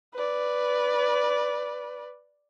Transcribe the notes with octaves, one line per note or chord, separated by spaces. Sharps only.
B4 D5